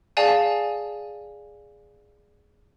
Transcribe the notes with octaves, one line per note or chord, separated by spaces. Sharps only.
G#4 D5 F5 G#5 A5